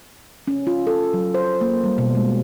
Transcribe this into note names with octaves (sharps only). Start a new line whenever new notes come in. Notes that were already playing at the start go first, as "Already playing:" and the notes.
C#4
F4
A4
F#3
C5
A#3
G3
B2
G#3